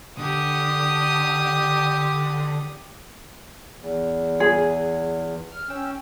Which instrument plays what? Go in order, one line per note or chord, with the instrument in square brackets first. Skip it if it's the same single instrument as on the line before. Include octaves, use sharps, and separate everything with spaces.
[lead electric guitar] D3 [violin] G4 D#6
[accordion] E2
[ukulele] G#4
[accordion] F6
C#4 G5 E6